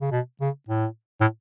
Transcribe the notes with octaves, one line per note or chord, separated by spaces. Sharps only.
C#3
B2
C#3
A2
A2